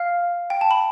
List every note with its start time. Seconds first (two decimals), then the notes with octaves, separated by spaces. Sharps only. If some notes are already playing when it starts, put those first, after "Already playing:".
Already playing: F5 F6
0.50 G5
0.61 A5
0.71 B5